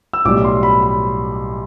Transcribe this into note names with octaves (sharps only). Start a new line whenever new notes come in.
E6
B1 A2 G3 D6
C6
B5
B5